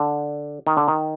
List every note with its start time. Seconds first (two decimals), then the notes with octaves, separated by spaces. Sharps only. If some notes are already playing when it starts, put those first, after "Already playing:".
Already playing: D3
0.67 D#3
0.77 D3
0.88 D#3